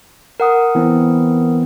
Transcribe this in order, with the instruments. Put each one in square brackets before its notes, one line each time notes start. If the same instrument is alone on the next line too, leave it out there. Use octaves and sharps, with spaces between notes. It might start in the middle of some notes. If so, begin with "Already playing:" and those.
[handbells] A#4 F#5 D#6
[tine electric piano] E3 B3 C4